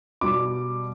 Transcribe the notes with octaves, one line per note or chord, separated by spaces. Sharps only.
B2 G3 D6